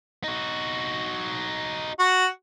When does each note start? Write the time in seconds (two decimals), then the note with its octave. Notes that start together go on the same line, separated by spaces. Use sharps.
0.24 D#4 F#4
1.99 F#4